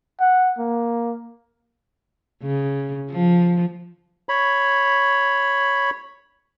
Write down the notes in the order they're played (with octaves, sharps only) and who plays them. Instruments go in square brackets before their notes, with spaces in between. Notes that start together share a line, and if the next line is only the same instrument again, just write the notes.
[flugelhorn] F#5
A#3
[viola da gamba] C#3
F3
[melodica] C#5 B5